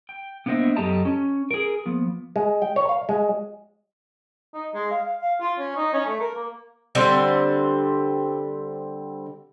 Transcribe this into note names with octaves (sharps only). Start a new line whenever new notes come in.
G5
A#3 B3 D4 C5 D#5 E5
F#2 G4 A4 D#5 A5 A#5
C#4
G#4 A#4
F3 A#3 B3
G#3
G5
C#5
F5
G#3
D#4
G#3
F5
F5
F5
F4
C#4
D#4
C#4
A3
A#4
A#3
D3 G3 C4